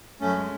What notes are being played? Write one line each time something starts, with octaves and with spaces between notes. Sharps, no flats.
F#2 A3 C#4
G#3